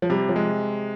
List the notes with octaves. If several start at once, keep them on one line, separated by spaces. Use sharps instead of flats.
F3
C3 G3
F3
G#3